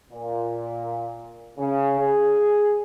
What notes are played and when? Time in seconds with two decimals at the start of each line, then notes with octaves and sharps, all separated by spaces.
0.12 A#2
1.58 C#3
2.00 G#4